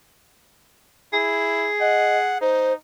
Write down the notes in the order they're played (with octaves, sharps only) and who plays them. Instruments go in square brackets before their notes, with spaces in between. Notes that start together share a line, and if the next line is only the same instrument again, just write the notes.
[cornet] E4 [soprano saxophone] G#4
[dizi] D#5 [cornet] F#5
[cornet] D#4 [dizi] C5